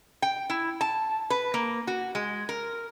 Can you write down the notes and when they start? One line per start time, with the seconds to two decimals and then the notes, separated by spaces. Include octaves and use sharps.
0.22 G5
0.50 E4
0.81 A5
1.30 B4
1.54 A#3
1.87 F#4
2.15 G#3
2.49 A#4